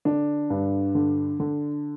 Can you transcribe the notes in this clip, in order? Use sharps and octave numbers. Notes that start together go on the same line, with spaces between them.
D3 D4
G2
D3
D3